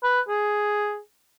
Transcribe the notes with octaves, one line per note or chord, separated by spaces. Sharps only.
B4
G#4